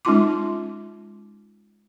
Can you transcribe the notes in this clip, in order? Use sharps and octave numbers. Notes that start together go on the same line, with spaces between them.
G#3 C#4 D#4 F4 C6 D6